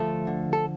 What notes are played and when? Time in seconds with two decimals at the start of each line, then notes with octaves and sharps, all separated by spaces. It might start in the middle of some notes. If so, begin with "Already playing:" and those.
Already playing: D2 F3 A3 A4
0.27 D3
0.53 A4